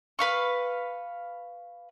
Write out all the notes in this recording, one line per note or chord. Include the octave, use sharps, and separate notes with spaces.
B4 F5 C#6